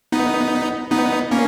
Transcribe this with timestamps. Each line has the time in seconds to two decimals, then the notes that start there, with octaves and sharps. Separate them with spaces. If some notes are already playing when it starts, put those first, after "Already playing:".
0.12 B3 D#4
0.91 B3 D#4
1.31 A#3 C#4